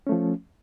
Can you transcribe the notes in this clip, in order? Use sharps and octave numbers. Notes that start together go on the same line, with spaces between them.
F3 A3 C#4